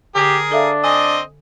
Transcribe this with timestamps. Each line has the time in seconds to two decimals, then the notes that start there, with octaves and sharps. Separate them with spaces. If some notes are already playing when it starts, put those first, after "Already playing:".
0.15 D3 G4 G#4 A#4
0.52 D4 A4 E5 F5
0.84 C4 D#5 G#5 D#6